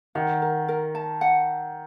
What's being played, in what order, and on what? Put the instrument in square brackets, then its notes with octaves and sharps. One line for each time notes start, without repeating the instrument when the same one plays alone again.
[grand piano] D#3 [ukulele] F#5
[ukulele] A#4
A#4
A5
F#5